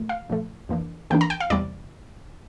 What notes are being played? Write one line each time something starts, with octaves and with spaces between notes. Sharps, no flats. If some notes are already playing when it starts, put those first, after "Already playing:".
Already playing: A#2 F3 A3
F5
A#2 F3 A3
F2 E3 A#3 D4
F2 E3 A#3 D4 G5
A#5
G5
F5
E2 C3 G3 D5